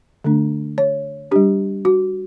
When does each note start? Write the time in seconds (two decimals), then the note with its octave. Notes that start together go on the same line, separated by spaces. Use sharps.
0.24 D3 A3 D4
0.78 C#5
1.31 G3 D4 G4
1.85 F#4